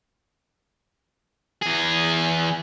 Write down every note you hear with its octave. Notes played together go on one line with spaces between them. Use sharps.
E2 G#4